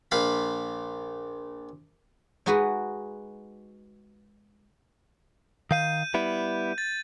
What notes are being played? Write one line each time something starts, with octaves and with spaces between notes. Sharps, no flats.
A#1 F5 B5
G#3 D#4 F#4 G#4 B4
D#3 F5 G6 D#7
G3 B3 E4
A6